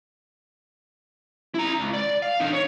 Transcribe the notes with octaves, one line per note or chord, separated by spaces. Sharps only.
E4 A#5
C#2
D5
F5
D3 D#4
C#5